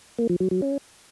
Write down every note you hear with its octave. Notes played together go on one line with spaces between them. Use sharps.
A#3
F3
F#3
F#3
C#4